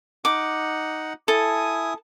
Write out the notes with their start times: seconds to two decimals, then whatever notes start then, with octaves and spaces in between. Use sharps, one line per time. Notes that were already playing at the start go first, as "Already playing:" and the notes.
0.25 D#4 F#5 D6
1.28 E4 A4 G#5 D#6